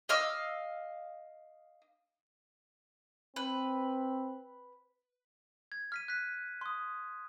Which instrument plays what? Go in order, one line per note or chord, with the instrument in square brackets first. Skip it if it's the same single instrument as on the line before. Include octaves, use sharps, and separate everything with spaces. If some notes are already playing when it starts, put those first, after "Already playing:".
[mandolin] D#5 F5 E6
[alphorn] C4 [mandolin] B4
[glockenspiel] G#6
F6 B6 D#7
F#6 B6
C6 D#6